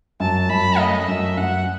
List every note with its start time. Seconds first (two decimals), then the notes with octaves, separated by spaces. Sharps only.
0.20 F#2 A5
0.50 F#2 B5
0.78 A3 D#5
1.08 F#2 E5
1.37 F#2 F#5